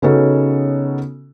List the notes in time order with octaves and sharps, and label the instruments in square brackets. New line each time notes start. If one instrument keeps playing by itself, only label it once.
[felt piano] C#3 B3 C#4 D#4 F#4 A4